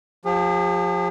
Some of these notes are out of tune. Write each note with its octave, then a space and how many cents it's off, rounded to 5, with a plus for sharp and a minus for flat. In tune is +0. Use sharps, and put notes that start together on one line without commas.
F3 +30 G#4 -45